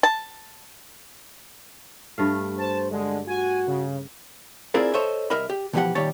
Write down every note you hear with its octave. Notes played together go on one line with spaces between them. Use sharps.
A5
G2 A3 F5
C5 A5
D3 G#3
F#4 G#5
C#3
C4 E4 F4 G#4 A#4 D5
A4 C5 C#5 D#5 E5
C2 A#4 D#5 E5 B5
G4
B2 E3 F3 D#4 G4 F#5
A#2 D#3 G3 G4 C#5 A5